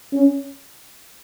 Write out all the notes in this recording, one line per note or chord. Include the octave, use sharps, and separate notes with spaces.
C#4